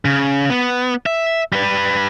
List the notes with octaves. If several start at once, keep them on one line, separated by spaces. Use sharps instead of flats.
C#3
B3
E5
G3 B4